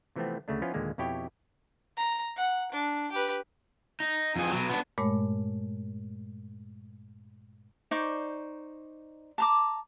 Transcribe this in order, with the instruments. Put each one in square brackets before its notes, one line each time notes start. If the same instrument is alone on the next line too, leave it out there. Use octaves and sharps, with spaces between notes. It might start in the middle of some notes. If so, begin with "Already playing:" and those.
[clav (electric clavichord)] C3 E3 F3 A3 B3 C4
D2 C#3 A3 D4
F3 B3 C#4 E4 F4
D#2 A#2 D3 G#3 A#3
F2 B2 E4 G4 C#5 G5
[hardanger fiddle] A#5
F#5
D4
G4 B4
[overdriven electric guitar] D#4
F2 G#4
B2 F#3
B3 D4
[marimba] G2 A#2 G#3 A3 C#5 D6
[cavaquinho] D#4 C5 D5 C#6
A5 A#5 D6